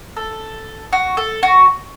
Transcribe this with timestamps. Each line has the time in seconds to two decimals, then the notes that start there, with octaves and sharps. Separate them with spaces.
0.17 A4
0.93 F#4
1.17 A4
1.43 F#4